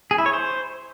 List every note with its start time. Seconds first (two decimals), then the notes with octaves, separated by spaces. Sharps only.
0.11 G#4
0.18 E4
0.26 C#5
0.33 C5